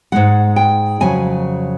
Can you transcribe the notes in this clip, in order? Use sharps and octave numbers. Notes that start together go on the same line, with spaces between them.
G#2 E3 G#3 F#5
G5
F2 C#3 F#3 G#5